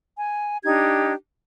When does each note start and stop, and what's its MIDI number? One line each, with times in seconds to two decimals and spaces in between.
0.18 0.60 80
0.64 1.13 62
0.64 1.13 63
0.64 1.13 67
0.64 1.13 92